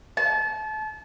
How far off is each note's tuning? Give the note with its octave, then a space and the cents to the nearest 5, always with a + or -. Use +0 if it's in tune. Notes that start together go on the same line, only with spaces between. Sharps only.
A5 -30